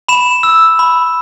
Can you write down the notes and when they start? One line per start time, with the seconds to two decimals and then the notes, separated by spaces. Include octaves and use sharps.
0.08 B5 E7
0.43 E6
0.79 B5